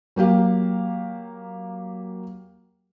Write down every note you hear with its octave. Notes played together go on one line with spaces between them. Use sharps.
F#3 A#3 G4 F5